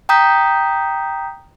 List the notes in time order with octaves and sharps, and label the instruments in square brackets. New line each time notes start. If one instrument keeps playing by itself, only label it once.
[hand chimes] G5 A#5 D#6 G6 B6